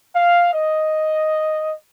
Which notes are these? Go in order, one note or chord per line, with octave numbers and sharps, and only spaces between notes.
F5
D#5